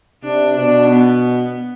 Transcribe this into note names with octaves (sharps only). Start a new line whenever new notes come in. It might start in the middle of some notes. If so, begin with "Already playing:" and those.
C3 D4
B2 D4
B3